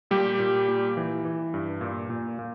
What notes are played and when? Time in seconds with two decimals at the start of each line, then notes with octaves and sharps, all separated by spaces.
0.11 A#2 G3 G4
0.40 A#2
0.68 A#2
0.97 E3
1.25 E3
1.54 G2
1.81 A#2
2.10 A#2
2.39 A#2